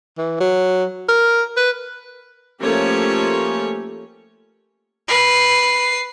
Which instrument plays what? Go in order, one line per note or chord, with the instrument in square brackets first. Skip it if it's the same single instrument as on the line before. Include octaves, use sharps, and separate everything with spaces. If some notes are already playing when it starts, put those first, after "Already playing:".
[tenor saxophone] E3
F#3
A#4
B4
[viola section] F3 A3 A#3 C#4 G4 C#5
[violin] B4 C7